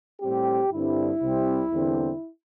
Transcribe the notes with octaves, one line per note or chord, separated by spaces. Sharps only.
A2 G3 C4 G4
G2 D3 G3 C4 E4
C2 C3 G3 C4
E2 D3 G3 C4